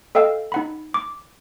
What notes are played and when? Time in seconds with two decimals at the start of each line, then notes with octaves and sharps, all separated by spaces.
0.15 A4 D#5 F5 G5 E6
0.52 D#4 F#5 B5
0.94 D6